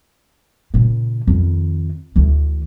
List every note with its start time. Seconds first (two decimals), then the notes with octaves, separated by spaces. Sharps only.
0.74 A#2 C#3
1.27 F2 D#3
2.16 D2 E3